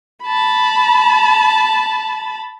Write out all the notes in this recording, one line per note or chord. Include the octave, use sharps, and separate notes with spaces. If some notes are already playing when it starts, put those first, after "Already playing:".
A5 B5